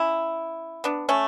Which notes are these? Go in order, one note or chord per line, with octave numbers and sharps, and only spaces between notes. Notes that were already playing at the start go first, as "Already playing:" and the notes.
Already playing: C#4 E4
B3 D4
A3 C#4